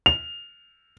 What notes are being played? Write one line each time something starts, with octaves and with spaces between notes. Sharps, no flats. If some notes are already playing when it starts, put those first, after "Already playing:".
F7